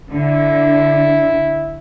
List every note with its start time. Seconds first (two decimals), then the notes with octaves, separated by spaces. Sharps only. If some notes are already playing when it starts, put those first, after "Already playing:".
0.11 D3 E4